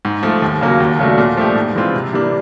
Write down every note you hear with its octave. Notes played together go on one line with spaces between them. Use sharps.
G#2
F3 A3
D#2
C#3 F#3 A#3
D#2
C#3 F#3 A3 D4
A#2
F3 A3 D4 G4
G#2
E3 G#3 C4 F4
C3
E3 G3 A#3 D4